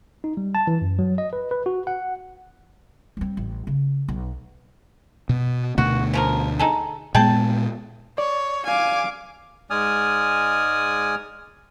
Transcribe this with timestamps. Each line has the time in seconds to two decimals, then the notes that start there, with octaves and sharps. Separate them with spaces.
0.24 D#4
0.37 G3
0.55 A5
0.67 E3
0.81 F#2
0.99 F#3
1.18 D#5
1.33 B4
1.51 B4
1.66 F#4
1.87 F#5
3.17 G3 C4
3.37 A1
3.67 C#3
4.08 B1
5.29 B2
5.78 D2 B2 A3 F#4
6.14 C#3 F3 A#4
6.59 D#4 G#4 A4
7.15 A#2 G#3 B3 G#4 G5 A5
8.18 C#5 D5
8.65 F5 G#5 D6
9.70 G#2 G#3 D5 G#5 D#6 F6